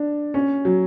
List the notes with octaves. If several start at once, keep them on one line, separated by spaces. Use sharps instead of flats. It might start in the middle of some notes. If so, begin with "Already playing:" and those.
Already playing: D4
C#4
F#3